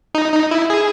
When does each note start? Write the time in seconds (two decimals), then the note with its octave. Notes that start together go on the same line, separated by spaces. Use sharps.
0.15 D#4
0.32 D#4
0.51 E4
0.70 G#4